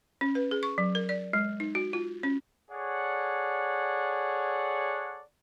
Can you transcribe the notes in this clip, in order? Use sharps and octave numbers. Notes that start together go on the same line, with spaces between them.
C#4
B4
G#4
C#6
F#3
A#4
D5
G#3
D#4
F#4
F4
C#4
G#4 A4 C#5 D5 F#5